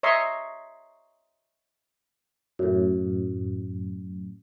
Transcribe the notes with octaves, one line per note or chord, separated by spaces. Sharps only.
C#5 D#5 E5 A#5 C6 C#6
F#2 A2